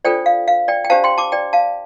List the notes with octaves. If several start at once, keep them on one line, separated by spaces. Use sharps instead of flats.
D4 F4 A4 C5 D5 G5
F5
F5
D5 G5
G5
D4 G4 C5 F5 A5
G5 C6
A5 D6
D5 G5
F5 A5